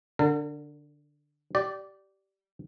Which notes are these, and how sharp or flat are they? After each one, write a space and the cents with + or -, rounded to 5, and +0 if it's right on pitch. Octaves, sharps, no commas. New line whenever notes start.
D3 +0 A#4 -45
G4 -20 D5 +0